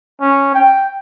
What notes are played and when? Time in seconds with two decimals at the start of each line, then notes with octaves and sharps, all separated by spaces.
0.21 C#4
0.54 G5